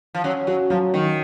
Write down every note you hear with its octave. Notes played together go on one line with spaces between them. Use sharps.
F3
F#3 C#4
F#3 F#4
F3 F#3
D#3 F#3